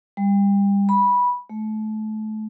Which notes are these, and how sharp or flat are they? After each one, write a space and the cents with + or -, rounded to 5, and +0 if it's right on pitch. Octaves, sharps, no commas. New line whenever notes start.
G3 +30
B5 -10
A3 -30